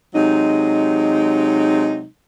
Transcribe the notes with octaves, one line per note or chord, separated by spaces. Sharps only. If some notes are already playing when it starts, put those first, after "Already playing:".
C3 F#3 G#3 D#4